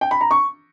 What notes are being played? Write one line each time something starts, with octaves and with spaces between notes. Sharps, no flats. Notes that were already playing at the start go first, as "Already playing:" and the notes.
G5
B5
A#5
C#6